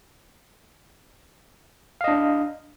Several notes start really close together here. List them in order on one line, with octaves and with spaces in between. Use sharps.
F5 D#5 D4